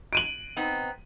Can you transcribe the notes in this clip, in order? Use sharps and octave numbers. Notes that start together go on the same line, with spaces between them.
D7 D#7 F#7
B3 C4 D#4